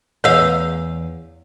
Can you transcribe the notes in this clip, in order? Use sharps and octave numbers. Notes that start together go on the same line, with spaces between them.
E2 C#5 F5 E6